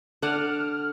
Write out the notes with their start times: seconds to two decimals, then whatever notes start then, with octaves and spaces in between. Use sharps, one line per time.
0.22 D3 D4 F#5 F6